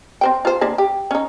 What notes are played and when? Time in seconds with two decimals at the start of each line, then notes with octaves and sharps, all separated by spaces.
0.21 C4 C5 G5
0.45 F4 C5
0.61 D3 A#3 C5
0.78 G4
1.11 C#4 D#4